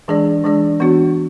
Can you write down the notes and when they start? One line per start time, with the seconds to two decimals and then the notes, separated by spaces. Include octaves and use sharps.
0.08 E3 G#3 D4 G#4 D5
0.44 E3 G#3 D4 G#4 D5
0.80 E3 B3 D4 F#4 C#5